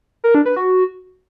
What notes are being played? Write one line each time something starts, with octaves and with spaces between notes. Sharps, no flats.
A#4
D4
B4
F#4